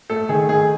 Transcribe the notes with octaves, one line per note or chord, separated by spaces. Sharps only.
A3 A4
D#3 G#4
D#3 G#4